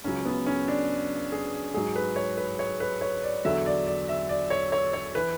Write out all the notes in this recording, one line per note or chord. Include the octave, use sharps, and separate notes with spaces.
C#2 C#3 F#3 C#4
B3
C#4
D4
G#4
G#2 F#3 G#4
B4
C#5
B4
C#5
B4
C#5
D5
E2 D3 F#3 E5
D5
D5
E5
D5
C#5
C#5
C#5
E3 B4